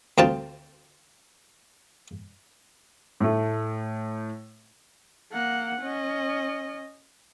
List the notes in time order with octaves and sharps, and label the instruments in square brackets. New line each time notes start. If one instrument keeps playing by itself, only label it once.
[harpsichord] D2 C4 F4 G5 A5
[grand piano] A2 A3
[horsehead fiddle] A#3 F#5
C#4 D#5